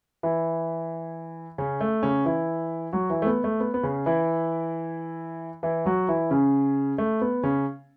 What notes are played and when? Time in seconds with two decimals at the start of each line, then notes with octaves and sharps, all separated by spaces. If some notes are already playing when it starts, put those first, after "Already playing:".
0.23 E3 E4
1.58 C#3 C#4
1.81 A3
2.03 C#3 C#4
2.25 E3 E4
2.93 F#3 F#4
3.10 E3 E4
3.22 A3
3.26 B3
3.44 A3
3.60 B3
3.74 B3
3.83 C#3 C#4
4.06 E3 E4
5.63 E3 E4
5.86 F#3 F#4
6.08 E3 E4
6.30 C#3 C#4
6.98 A3
7.21 B3
7.43 C#3 C#4